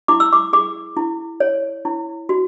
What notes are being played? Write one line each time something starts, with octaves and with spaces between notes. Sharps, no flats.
E4 D6
E6
D6
G#4 D6
E4
C#5
E4
F#4